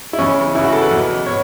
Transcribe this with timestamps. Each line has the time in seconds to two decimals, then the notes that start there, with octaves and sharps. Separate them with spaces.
0.13 E4
0.19 E2 C#3 E3 C#4
0.55 E2 C#3 E3 E4
0.64 F#4
0.73 A4
0.81 B4
0.91 E2 B2
1.26 B2 C#5